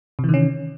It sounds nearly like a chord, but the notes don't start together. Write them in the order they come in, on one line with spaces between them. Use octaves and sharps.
C3 E3 D#3 C#4